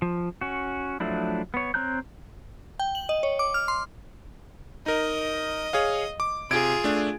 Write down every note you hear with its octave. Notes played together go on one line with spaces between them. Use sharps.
F3
C#4 F#4
F3 F#3 A3 D4 E4
B3 C#5
C4 C#5 A#5 F#6 G6
G5
F#7
D#5
C#5
D6
F6
C6
D#4 A#4 D#5
G#4 C#5 F5
D6
C3 F4 G#4 G#6 D7
A3 D4